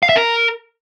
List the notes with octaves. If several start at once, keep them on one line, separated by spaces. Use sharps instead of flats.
F5
E5
A#4